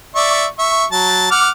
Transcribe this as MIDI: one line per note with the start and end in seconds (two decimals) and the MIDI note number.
0.15 0.46 74
0.15 0.46 76
0.15 0.46 85
0.59 0.85 76
0.59 0.85 85
0.92 1.27 54
0.92 1.27 81
1.31 1.49 78
1.31 1.49 86
1.31 1.49 89